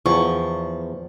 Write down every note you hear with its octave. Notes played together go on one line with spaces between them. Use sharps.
E2 F3 C#6